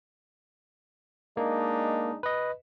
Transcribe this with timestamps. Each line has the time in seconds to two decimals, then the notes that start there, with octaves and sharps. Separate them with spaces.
1.37 G#3 A#3 D4 D#4
2.23 B4 D#5